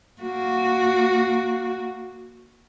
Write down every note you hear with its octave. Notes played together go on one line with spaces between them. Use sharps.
A#3 F#4